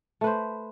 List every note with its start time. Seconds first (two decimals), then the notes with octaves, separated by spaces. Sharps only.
0.21 A3
0.24 B4
0.27 C5